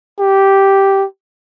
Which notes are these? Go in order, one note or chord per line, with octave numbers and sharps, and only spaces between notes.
G4